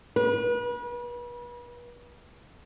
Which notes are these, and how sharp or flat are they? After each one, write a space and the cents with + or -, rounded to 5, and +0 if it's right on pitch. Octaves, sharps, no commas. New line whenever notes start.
B4 -35